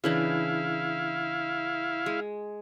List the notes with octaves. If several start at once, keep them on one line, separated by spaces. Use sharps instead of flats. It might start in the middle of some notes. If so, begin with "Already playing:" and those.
C#3 E3 D4 E4 F5
G#3